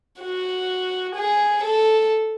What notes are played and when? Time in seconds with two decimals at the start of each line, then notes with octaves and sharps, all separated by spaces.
0.21 F#4
1.16 G#4
1.64 A4